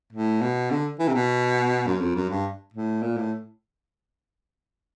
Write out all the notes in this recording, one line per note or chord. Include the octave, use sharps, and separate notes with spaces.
A2
B2
D3
E3
C3
B2
F#2
F2
F#2
G2
A2
A#2
A2